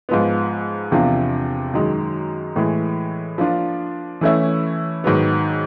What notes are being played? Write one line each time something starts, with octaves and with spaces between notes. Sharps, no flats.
G#2 F3 G#3 B3
E2 C3 F3 A#3 D4
F#2 D#3 G#3
A2 E3 G#3
F3 A#3 D4 F4
E3 A3 C#4 E4
G#2 D#3 F#3 B3